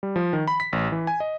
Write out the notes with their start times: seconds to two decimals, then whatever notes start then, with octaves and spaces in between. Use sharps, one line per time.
0.03 G3
0.16 F3
0.33 D#3
0.48 B5
0.60 B6
0.73 A1
0.92 E3
1.07 G#5
1.20 D#5